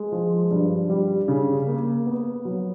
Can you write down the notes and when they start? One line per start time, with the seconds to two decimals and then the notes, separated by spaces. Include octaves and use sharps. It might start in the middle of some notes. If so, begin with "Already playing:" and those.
Already playing: G#3
0.12 F3
0.51 G2
0.90 G3
1.28 C#3
1.67 A#3
2.06 B3
2.45 F#3